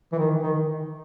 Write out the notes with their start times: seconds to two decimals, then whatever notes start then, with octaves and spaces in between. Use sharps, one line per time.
0.13 E3
0.18 D#3
0.43 D#3